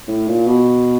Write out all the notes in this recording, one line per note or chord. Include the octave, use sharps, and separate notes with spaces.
A2
A#2
B2